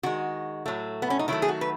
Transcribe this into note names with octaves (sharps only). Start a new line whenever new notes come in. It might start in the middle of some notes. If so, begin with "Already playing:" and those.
D#3 G#3 F#4
A2 F#3 A3
B3
C#4
D#4
D#3 F#3 A3 E4
G#4
F#4
B4